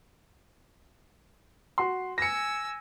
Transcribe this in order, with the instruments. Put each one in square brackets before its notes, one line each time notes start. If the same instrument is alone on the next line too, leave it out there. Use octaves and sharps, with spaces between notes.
[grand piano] F#4 C6
[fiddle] G#5 E6 [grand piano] A#6 C#7